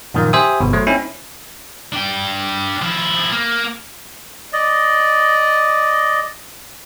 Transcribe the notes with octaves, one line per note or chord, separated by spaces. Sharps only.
F#2 A#2 D#3 F3 A#3
G4 C5 E5 G#5 D#6
G1 B2
F#3 A3 C5
C4 C#4 D#4 E4
D4 G5
F3 E4
A#3
D5 D#5